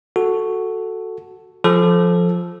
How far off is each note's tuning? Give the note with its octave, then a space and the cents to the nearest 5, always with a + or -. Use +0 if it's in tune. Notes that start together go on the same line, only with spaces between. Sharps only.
F#4 +0 A4 +0
F3 +5 A4 -15